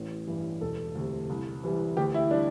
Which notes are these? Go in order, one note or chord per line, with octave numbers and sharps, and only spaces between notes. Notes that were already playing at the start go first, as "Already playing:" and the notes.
Already playing: A1
G2 E3 G3
E1 A4
D2 C3
C2
C3 E3 G3
D2 G4
E4
G3 D4